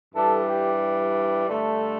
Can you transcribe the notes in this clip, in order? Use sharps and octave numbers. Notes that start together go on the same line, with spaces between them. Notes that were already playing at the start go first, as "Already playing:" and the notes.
G2 E3 G3 A4
G4
G2 D3 A3